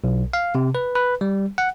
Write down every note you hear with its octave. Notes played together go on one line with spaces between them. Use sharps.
B1
F5
C3
B4
B4
G3
F#5